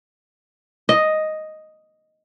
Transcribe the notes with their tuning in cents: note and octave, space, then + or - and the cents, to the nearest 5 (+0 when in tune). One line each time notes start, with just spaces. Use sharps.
D#5 +0